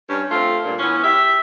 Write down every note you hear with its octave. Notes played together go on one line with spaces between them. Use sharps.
G2 C#4
A3 C4 F4
G2 A#2
E3 B3 C#4
G4 E5